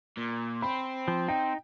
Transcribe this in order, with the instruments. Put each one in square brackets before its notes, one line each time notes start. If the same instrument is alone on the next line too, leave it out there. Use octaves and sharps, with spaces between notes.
[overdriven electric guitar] A#2
[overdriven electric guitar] C4 [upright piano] B5
[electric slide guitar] F3
[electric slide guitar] D#4 [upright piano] G5